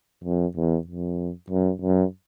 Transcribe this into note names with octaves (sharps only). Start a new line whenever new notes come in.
F2
E2
F2
F#2
F#2